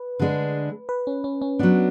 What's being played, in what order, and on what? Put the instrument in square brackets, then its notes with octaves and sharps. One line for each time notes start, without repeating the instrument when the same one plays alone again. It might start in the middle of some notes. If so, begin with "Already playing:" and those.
Already playing: [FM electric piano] B4
[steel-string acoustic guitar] D3 G#3 D4
[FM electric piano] B4
C#4
C#4
C#4
[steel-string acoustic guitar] F#3 B3 D4